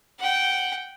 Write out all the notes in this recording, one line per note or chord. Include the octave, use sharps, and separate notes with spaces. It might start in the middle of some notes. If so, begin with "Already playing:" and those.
F#5 G5